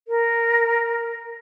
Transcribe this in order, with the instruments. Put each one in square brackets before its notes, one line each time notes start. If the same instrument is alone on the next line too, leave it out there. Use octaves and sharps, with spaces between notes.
[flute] A#4